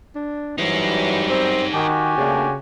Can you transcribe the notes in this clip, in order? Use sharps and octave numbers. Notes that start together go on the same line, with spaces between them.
D4
F#2 E3 F#3 G3 D#4 C5
C4
D#3 F#4 G4 G#5
C#3 A3 A#3 D4